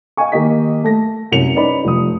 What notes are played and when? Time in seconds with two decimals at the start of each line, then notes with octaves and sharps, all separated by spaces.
0.17 D#5 F5 G5 G#5 C#6
0.32 D#3 A#3 G4 D#5 B6
0.84 A3 A4 A#6
1.32 C2 F#2 C3 C#4 C#7 F7
1.55 C#4 D#4 B4 D5 D#5 B5
1.85 F1 F3 D#6